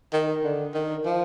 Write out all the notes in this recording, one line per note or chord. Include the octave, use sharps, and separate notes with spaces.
D#3
D3
D#3
F3